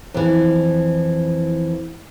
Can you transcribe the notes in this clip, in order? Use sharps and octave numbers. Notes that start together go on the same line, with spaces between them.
F2 E3